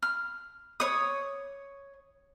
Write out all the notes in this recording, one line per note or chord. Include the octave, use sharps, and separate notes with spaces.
F6
C#5 D#6